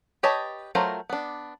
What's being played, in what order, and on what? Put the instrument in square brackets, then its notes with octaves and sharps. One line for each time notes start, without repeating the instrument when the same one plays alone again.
[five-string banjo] G4 B4 C#5 D#5 A5
F#3 A3 F4 A#4 C5
B3 D4